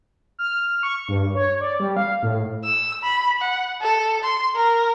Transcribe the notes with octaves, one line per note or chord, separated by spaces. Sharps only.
F6
C#6
G2
C#5
D5
G3
F5
A2
E6
B5
F#5
A4
C6
A#4